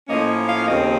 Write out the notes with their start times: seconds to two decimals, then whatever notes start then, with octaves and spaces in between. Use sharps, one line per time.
0.08 A2 F3 A#3 C#4 D#5
0.49 F5
0.68 D#2 C#3 F3 C4 D#5